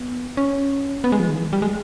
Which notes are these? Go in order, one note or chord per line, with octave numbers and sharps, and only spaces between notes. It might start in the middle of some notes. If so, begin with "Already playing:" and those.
Already playing: B3
C#4
B3
G#3
F3
D#3
E3
G3
G#3